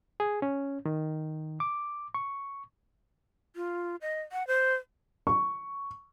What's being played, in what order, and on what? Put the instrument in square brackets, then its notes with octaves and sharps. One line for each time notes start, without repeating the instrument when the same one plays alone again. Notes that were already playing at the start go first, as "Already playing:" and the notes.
[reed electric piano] G#4
C#4
D#3
D6
C#6
[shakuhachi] F4
D#5
F#5
C5
[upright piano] C#6